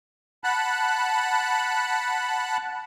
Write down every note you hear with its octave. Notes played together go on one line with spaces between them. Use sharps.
F#5 A5 B5 F#6